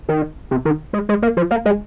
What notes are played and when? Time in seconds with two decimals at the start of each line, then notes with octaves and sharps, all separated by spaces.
0.09 D#3
0.51 C3
0.65 D#3
0.93 G#3
1.09 G#3
1.22 A#3
1.37 F3
1.51 A#3
1.65 G#3